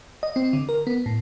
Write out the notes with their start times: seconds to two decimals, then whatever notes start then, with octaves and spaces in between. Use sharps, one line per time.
0.23 D#5
0.36 C4
0.53 D3
0.69 A#4
0.87 B3
1.06 A2